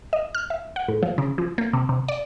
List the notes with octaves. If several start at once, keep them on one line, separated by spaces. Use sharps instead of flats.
D#5
F6
E5
F#5
A2
F3
C#3
F3
A#3
C3
C3
D5